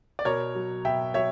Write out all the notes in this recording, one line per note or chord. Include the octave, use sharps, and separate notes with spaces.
D5
B2 A#4 C#5
F#3
B2 E5 G5
F#3 C#5 E5